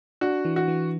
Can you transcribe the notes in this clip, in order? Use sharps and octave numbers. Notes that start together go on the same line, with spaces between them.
D4 F#4
E3
F#4
E3